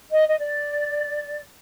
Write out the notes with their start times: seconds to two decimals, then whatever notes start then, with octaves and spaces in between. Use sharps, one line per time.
0.10 D#5
0.28 D#5
0.39 D5